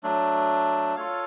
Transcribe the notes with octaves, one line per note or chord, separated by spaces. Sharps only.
F#3 A3 D4
F4 A4 C#5 F5